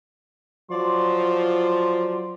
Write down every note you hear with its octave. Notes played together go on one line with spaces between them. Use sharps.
F3 F#3 D5 C6